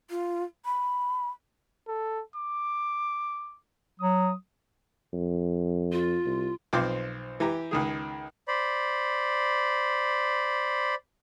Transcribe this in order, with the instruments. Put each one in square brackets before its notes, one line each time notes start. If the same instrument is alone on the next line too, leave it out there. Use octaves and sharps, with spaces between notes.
[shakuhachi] F4
B5
[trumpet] A4
D6
[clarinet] F#3 [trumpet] D#6
[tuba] F2
[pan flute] F4
[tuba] C2
[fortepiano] B1 F3 C4 G5 C6 D6
E3 G4 A#5
C#2 D#3 G#4
[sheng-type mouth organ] C5 D5 B5